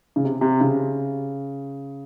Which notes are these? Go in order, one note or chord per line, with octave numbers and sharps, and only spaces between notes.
C#3
C3
C3
C#3